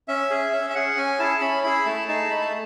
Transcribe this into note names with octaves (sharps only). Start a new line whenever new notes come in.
C#4 E5
G#4
C#4 E5
E5
G#4 F#5
C#4 G#5
E4 G#4 A5
C#4 B5
E4 G#4 B5
A3 A5
D#4 G#4 A5
A3 B5
A5